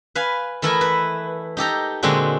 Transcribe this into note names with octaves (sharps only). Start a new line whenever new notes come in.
B4 F5 G#5
E3 A3 E4 A4 A#4 D#5
B4
D#4 G4 A4 A#5
A#2 D3 G#3 C4 D4 F#4